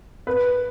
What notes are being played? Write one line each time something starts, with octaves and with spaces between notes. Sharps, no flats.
B4